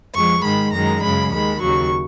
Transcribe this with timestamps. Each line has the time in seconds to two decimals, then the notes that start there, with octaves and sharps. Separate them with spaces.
0.13 F2 F3 G#3 C#6
0.43 G#2 D#3 G#3 B5
0.73 F#2 D#3 G#3 A#5
1.02 F#2 C#3 G#3 B5
1.31 D#2 D#3 G#3 B5
1.61 D#2 C#3 F#3 C#6